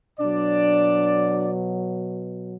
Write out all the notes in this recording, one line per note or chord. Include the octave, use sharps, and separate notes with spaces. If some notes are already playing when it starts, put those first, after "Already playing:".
B2 F#3 D4 D5